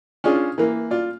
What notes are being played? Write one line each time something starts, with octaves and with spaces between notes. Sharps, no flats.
C#4 D4 F4 G#4
E3 A#3
F4 D5